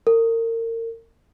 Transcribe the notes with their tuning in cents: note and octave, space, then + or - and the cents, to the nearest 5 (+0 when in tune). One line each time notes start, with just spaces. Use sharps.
A#4 -35